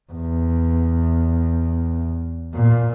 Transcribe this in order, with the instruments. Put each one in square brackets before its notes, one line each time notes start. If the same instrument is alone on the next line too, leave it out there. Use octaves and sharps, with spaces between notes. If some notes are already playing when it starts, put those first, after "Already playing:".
[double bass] E2
A#2